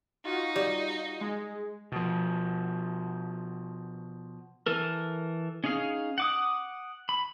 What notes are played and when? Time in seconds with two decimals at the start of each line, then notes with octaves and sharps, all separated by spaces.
0.25 D#4 F4 F#4
0.56 G3
1.21 G#3
1.92 B2 F3
4.66 E3 A4 A#4
5.64 C#4 D#4 G#4 F5
6.18 F#5 D6 D#6
7.09 B5